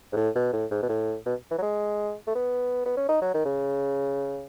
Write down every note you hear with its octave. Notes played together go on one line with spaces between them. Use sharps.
G#2
A2
B2
A2
G#2
B2
A2
B2
E3
F#3
G#3
A3
B3
B3
C#4
D#4
F#3
D#3
C#3